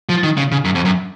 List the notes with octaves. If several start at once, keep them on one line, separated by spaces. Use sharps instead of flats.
F3
D#3
C#3
C#3
F#2
F2
F#2